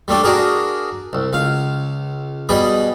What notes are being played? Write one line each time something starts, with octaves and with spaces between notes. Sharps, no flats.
G3 A3 D4 G4
D4 F#4 G#4 A#4
C2
C#2 F5
B2 G3 G#4 B5